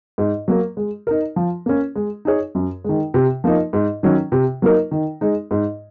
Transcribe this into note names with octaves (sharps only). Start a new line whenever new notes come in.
G#2
F#3 A#3
G#3
D#4 A#4
F3
A#3 C#4
G#3
D#4 G#4 C#5
F#2
D#3 G#3
C3
F3 A#3 D#4
G#2
D#3 F#3 C#4
C3
F#3 A#3 D#4 A#4
D#3
G#3 D#4
G#2